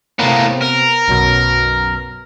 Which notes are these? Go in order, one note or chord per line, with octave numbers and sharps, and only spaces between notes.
A2 C3 A#3 B3
A#4
B1 F#2 B2